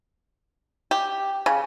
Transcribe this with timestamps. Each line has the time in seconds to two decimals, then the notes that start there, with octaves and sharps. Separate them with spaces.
0.91 G4
1.46 C#3